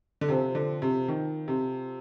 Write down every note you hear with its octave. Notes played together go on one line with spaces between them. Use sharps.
D3
C3 F3 C4 F4 A4
D3
C3
D#3
C3